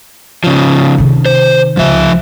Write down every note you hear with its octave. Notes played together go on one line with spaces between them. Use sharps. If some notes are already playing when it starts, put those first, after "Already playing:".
C#3 F3
C3 D#3
C5
C#2 F3 E5